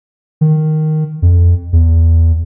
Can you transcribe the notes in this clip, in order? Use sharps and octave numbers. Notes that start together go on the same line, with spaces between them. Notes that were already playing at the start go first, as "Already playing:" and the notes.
D#3
F2
E2